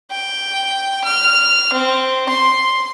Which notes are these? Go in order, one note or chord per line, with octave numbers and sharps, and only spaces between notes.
G5
F6
C4
C6